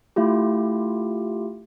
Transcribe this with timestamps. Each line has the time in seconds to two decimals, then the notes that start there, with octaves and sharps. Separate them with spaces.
0.16 A3 E4 F4 G4